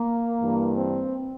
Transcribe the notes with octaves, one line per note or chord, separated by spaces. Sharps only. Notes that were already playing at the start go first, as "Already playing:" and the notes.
Already playing: A#3
G2 E3
C4